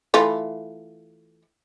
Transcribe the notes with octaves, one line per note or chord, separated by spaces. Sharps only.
E3 A3 F4